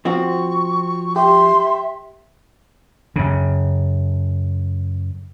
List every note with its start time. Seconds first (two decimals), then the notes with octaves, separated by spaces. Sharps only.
0.05 F3 C4 F#4 C#6
1.16 G4 E5 C6
3.16 F#2 C#3